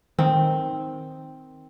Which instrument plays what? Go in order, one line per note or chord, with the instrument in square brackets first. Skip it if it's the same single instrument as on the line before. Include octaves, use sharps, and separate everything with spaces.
[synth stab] D#3 [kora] C4